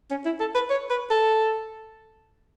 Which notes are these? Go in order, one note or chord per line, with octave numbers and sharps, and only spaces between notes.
C#4
E4
A4
B4
C#5
B4
A4